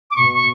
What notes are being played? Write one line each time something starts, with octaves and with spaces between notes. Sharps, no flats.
D6
B2 C#6
C#6